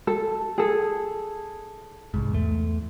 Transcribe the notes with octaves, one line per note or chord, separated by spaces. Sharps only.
A4
G#4 A4
C2 G#2
E2 A3